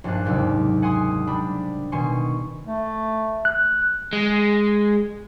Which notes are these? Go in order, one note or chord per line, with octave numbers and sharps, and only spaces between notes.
A#1 G2 D4 F4 F#6
F#1 D#2 G#2 C3 E6
F#5 G#5 C6 D#6
G3 D4 B5
B2 D#3 G#5 C6 C#6
A3
F#6
G#3